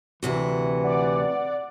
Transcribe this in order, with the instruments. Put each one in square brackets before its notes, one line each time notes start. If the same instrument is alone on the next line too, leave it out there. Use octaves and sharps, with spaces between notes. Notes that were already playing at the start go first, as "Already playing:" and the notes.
[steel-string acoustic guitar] D2 C3 F#4 [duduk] E3
[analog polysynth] D5 F#5